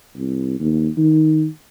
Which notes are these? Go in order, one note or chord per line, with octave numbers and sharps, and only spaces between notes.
C2
D#2
D#3